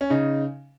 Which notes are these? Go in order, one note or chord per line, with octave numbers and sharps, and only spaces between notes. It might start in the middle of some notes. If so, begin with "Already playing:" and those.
C#4
C#3 D#4